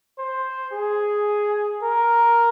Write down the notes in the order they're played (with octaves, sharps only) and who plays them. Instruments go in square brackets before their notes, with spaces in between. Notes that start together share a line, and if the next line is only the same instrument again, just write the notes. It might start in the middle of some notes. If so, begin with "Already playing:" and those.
[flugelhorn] C5
G#4
A#4